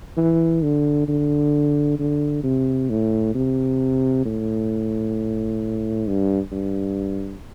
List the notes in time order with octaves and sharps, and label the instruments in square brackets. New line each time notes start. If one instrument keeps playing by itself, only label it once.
[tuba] E3
D3
D3
D3
C3
A2
C3
A2
G2
G2